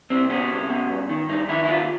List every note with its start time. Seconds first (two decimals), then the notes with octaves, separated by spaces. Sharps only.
0.10 C2 C4
0.30 B2 C#4
0.50 C2
0.69 B2
0.90 G2
1.09 D#3
1.28 G2 D#4
1.49 D#3 E4
1.64 E4
1.68 D#2 F4